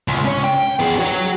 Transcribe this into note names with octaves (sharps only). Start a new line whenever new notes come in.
C#2
C#4 C#5
G5
B3 G#4
F#4 C#5